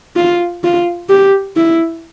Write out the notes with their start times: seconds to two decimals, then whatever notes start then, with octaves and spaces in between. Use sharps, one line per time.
0.16 F4
0.64 F4
1.09 G4
1.56 E4